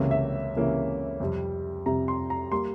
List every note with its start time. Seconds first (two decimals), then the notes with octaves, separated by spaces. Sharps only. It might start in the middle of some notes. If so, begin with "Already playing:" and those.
Already playing: C#2 C3 E3 A#3 C#4 E5
0.11 E5
0.55 C#2 C3 E3 A#3 C#4
1.20 F2 C3 G3
1.86 F2 C3 G3 A#5
2.08 C6
2.30 A#5
2.52 G3 A#3 C6